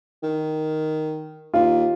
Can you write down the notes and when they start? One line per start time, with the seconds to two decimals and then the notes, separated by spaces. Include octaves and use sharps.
0.23 D#3
1.54 D#2 F4